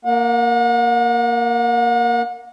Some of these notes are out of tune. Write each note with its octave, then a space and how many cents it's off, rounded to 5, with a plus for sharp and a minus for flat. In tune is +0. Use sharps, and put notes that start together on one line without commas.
A#3 +0 F#5 -40